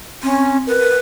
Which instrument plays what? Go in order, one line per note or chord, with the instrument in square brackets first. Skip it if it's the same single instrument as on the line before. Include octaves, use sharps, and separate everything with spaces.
[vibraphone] C4 [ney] C#4
[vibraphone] A#4 [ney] B4